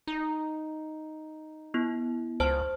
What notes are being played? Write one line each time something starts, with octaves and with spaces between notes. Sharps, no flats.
D#4
B3 E4
C#2 C5 A5 F6